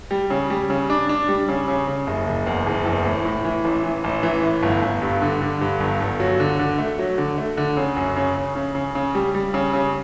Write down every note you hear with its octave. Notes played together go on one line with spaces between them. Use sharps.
G3
C#3
G3
C#3
D4
D4
G3
C#3
C#3
C#3
F#1
F#1
E2
F#1
E2
A2
A2
E3
A1
E3
A1
E3
A2
G1
G1
G2
D3
D3
G2
G1
G1
F#3
D3
D3
A3
F#3
D3
A3
D3
C#3
F#2
C#3
C#3
C#3
C#3
C#3
G3
G3
C#3
C#3